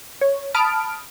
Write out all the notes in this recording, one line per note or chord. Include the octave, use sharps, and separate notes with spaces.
C#5
A5 B5 D#6 F6 D7